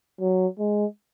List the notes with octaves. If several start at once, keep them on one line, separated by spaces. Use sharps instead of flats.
F#3
G#3